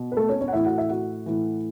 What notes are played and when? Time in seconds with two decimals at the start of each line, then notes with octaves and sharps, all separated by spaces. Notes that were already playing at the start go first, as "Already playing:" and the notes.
Already playing: B2
0.12 B4
0.17 A3 A4
0.29 C#4 C#5
0.41 C#4 C#5
0.48 F#5
0.53 A2 E3 E4 E5
0.65 F#4 F#5
0.78 E4 E5
0.90 F#4 F#5
1.26 A2 E3